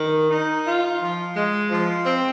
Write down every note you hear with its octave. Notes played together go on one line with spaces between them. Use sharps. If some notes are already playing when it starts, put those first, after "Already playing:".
Already playing: D#3
D#4
F4
F3
G#3
F3
C4